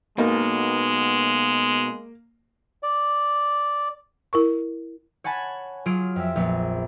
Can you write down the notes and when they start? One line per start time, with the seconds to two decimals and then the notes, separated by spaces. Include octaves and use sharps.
0.18 B2 G#3 A#3 D#4
2.83 D5
4.33 E4 A#4 C#6
5.24 C#5 F#5 G#5 A5 B5
5.86 F#3 F4 G#4 F5 D7
6.16 F2 E5
6.36 A#1 B3